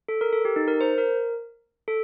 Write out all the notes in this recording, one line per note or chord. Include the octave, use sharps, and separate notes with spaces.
A4
A#4
A4
G4
D#4
A#4
C5
A#4
A4